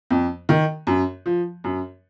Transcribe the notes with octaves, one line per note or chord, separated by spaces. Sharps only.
F2
D#3
F#2
F3
F#2